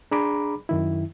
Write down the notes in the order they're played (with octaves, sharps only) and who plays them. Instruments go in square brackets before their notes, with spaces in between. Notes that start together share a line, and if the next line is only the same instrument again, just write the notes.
[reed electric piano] D4 G#4 A#5 B5 D6
F#2 D#3 E4